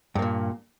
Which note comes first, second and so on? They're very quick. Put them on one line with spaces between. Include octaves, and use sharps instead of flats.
G2 A#3 A#2